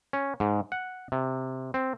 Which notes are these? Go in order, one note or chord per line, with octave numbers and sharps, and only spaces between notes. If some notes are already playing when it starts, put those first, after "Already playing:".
C#4
G#2
F#5
C3
C4